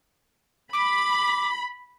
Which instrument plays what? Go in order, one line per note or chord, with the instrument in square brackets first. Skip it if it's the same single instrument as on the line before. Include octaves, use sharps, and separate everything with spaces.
[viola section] B5 [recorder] D6